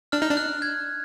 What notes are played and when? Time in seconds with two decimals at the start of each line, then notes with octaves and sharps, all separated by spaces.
0.12 D4 F6
0.22 D#4
0.31 D4
0.37 F#6
0.62 G#6